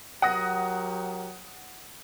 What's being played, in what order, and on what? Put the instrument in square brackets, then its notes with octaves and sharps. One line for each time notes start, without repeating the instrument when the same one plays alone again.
[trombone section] F#3 G4 A#4 [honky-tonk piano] F#5 D#6 A#6